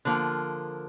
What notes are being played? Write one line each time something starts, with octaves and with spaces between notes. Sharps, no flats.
D3 F3 A#3